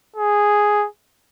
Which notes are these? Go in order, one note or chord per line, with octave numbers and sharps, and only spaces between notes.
G#4